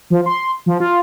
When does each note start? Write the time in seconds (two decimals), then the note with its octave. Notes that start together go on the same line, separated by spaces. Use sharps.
0.10 F3
0.26 C6
0.66 F3
0.80 F4